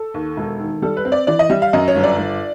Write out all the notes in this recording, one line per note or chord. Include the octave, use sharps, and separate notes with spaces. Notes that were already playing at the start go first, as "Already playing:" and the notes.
Already playing: A4
D#2
E1
D#3
G3 A4
B4
C4
D5
E3 D5
D#5
G3 E5
F5
F#2 D#5
C#5
G1
D5
G1